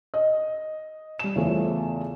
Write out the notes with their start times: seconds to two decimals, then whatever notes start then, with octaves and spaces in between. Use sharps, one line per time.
0.14 D#5
1.19 G3 E7
1.35 E2 C#3 A3 F4 C5